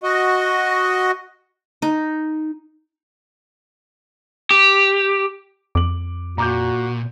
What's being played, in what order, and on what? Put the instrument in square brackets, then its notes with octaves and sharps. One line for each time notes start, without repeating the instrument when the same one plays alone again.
[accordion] F#4 D#5
[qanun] D#4
[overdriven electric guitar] G4
[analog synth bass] F2 [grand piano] D6 F#7
[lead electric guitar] A#2 [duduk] F#4 [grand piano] A#5 D6 G6